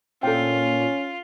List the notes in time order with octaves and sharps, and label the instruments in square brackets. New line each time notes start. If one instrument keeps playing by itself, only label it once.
[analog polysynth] A#2 [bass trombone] C#4 [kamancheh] F4 [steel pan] A4 G5